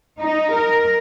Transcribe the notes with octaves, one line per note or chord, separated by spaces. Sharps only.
D#4
A#4